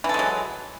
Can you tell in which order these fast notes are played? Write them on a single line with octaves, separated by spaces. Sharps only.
E3 A4 G#3 F#3